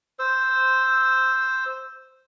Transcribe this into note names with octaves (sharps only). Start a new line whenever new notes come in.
C5 E6